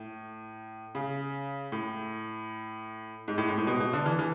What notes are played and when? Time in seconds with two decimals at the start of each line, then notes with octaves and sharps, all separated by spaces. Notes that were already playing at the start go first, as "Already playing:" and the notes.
Already playing: A2
0.95 C#3
1.72 A2
3.28 G#2
3.38 A2
3.48 G#2
3.58 A2
3.67 B2
3.80 B2
3.93 D3
4.06 E3
4.19 E3